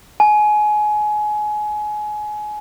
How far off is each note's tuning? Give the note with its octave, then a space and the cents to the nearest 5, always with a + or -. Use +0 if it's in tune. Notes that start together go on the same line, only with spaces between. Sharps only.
G#5 +25